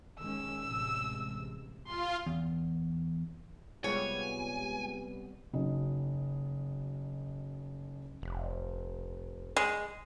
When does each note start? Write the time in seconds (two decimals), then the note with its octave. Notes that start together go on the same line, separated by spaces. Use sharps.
0.20 D#3 G#3 C#4 E6
0.63 A1 C3 G#3
1.87 F4 C6
2.26 E2
3.84 C3 G3 G#3 B3 F4 C#5 G#5
5.53 F#1 F#3 D#4 D#5
8.22 F1
9.56 G#3